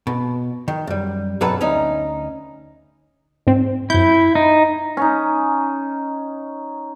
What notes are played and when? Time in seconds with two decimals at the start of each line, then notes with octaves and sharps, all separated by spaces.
0.07 B2
0.68 D#3
0.87 F#2 G3
1.41 B1 G2 F#3 C#4 A4 B4
1.61 D2 C#4 D#4
3.47 G#2 C4
3.90 F#2 E4 G6
4.35 D#4
4.97 C#4 D#4